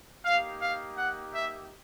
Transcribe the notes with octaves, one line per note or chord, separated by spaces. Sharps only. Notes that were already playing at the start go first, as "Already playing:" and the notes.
A#3 D#4 G4 F5
F5
F#5
E5